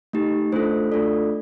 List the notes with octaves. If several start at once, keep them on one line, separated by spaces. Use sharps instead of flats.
A3 D#4 G4
A3 D4 F4 A4 C5
A3 D4 F4 A4 D5